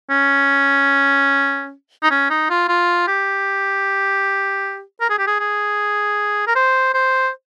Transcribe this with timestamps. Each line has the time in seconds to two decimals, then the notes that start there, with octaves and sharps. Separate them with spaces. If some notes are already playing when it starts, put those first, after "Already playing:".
0.10 C#4
2.03 D#4
2.11 C#4
2.30 D#4
2.50 F4
2.69 F4
3.07 G4
5.01 A#4
5.10 G#4
5.19 G4
5.27 G#4
5.40 G#4
6.48 A#4
6.56 C5
6.94 C5